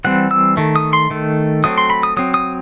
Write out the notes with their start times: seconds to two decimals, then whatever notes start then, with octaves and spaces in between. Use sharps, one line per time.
0.05 E3 G3 C4 F#5
0.31 E6
0.57 D#3 A3
0.76 D#6
0.93 C6
1.10 D#3 A3
1.64 F#3 A3 C4 D#6
1.78 C6
1.90 B5
2.03 D#6
2.17 F#3 C4 D#6
2.34 D#6